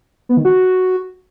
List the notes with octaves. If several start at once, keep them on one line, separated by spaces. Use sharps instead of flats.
B3
D#3
F#4